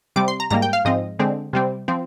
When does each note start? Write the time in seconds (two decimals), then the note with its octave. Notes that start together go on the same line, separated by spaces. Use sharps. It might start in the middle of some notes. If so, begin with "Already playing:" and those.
0.16 C3 G3 C4 D6
0.28 C6
0.40 A#5
0.50 G#2 G3 A#3 A#5
0.62 G5
0.73 F5
0.85 G#2 F3 C4 D#5
1.19 D3 G#3 C4
1.53 C3 G3 C4
1.88 F3 C4